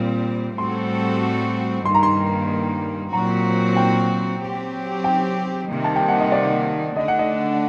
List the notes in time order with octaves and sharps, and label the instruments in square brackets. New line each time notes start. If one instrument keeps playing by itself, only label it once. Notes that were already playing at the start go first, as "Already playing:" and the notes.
Already playing: [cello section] A#2 G3 C4
[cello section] A2 G3 C4 F#4 A4 [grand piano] C6
[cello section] G2 D#3 G3 A#3 [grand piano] C6
[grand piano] A#5
C6
[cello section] A#2 F#3 C4 F#4 [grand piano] A#5
[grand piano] G5
[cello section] F#3 C4 G4
[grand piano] G5
[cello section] C3 D#3 G3 A#3
[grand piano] A5
G5
F#5
D#5
D5
[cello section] D3 A3 D4 [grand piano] D#5
[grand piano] F#5
D#5